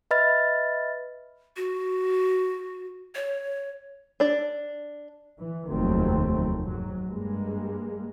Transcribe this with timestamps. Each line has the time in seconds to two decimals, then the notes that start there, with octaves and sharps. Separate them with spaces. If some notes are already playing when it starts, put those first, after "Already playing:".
0.11 B4 D#5 E5 B5 F6 A6
1.56 F#4
3.15 C#5
4.20 D4 D5
5.38 E3
5.68 F1 D#2 D#3 F#3 A3 C4
6.63 G#2 F#3
7.06 G2 G#3 A#3